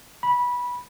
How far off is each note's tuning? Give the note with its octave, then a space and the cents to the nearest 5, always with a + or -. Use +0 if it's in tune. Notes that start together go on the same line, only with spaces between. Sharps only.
B5 -15